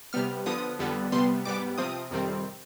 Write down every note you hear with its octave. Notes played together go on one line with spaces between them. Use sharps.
C3 G3 B3 F6
D3 F3 B3 D#6
F2 D3 G3 B3
C3 G3 B3 C6
G#2 G3 B3 D6
C3 F3 C4 D#6
F2 C3 D#3 G3 C4